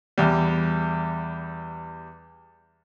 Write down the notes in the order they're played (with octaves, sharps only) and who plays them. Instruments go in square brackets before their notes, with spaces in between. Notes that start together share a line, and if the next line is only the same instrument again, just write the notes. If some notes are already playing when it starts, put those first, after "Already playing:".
[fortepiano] E2 G3